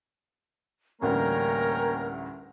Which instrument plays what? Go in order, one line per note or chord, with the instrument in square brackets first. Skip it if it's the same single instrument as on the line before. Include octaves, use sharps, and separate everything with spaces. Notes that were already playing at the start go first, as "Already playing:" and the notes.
[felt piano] A1 D2 G3 [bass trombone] A#3 [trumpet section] C#4 G5 A#5 [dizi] A#4